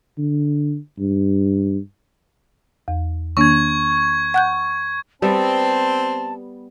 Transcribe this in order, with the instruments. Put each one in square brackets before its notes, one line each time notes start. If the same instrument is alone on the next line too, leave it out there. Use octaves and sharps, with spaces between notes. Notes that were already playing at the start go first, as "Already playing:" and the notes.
[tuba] D3
G2
[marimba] E2
[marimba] D#3 A#3 D4 [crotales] C#6 G#6
[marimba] F#5 F#6 G6
[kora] G3 B3 E5 [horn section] C4 [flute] A5